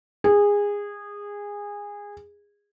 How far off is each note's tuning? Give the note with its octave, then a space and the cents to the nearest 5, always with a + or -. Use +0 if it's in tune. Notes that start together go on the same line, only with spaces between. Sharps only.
G#4 -20